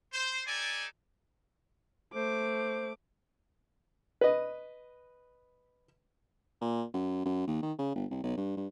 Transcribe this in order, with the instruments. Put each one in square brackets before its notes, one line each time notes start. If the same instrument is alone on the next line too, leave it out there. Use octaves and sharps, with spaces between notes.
[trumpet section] C5
D#4 G4 A4 D5 G#5
[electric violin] A3 D6 [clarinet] C5
[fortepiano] B4 D#5
[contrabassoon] A#2
F#2
F#2
D#2
D#3
C#3
G1
C2
B1
G2
G2